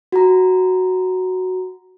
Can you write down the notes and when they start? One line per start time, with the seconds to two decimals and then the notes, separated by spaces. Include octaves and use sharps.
0.12 F#4 A#5